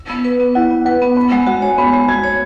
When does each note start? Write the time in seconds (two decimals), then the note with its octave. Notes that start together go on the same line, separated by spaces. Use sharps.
0.09 B3
0.24 B4
0.40 B3
0.55 E4 F#5
0.71 B3
0.85 B4 F#5
1.02 B3
1.17 B3 B5
1.32 G#3 F#5
1.46 F#4 F#5
1.62 C#5 G#5
1.78 B3 B5
1.93 G#3
2.08 F#4 G#6
2.24 C#5